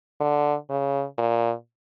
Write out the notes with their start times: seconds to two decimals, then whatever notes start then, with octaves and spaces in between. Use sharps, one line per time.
0.20 D3
0.70 C#3
1.18 A#2